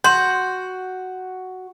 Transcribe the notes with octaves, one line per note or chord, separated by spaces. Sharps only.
F#4 C6 G6